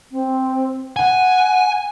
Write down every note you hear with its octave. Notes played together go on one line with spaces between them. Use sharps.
C4
F#5 G#5